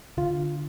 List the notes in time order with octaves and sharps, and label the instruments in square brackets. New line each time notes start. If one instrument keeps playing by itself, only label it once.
[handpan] D3 [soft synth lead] F4